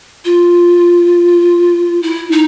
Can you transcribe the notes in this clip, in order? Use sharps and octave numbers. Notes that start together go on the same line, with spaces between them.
F4
E4
D#4